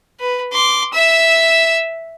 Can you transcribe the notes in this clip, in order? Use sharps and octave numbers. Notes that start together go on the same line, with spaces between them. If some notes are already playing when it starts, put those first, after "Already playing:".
B4
C6 D6
E5 E6